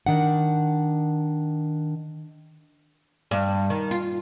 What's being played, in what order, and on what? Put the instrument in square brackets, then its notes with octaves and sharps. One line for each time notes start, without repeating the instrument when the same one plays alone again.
[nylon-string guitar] D#3 D4 F#5
[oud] G2
D#3
F4